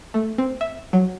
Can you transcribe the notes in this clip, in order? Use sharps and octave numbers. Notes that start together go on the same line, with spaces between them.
A3
C4
E5
F#3